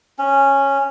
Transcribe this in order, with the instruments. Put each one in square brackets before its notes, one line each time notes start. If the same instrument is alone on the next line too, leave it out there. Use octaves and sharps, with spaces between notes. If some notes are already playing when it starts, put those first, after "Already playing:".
[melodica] C#4